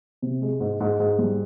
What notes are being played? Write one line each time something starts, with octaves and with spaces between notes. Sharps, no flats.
C3
G#3
G#2
G#2
G#2
G3